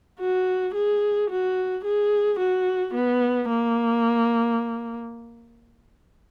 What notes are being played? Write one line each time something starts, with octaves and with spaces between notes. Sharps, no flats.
F#4
G#4
F#4
G#4
F#4
B3
A#3